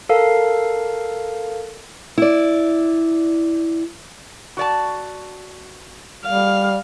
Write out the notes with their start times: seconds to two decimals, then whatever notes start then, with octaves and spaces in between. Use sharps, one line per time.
0.09 A4 A#4 F5
2.18 E4 D5
4.57 F#4 D5 A5
6.26 G3 F5